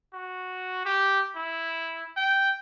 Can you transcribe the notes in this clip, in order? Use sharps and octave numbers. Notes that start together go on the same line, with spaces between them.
F#4
G4
E4
G5